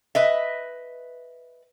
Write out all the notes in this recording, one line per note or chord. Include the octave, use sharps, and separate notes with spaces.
B4 D#5 E5